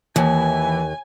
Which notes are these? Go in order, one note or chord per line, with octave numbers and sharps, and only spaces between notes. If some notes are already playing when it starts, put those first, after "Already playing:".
D#2 E3 G#5